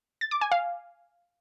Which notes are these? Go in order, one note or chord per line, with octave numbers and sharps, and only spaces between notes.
A6
D6
G#5
F5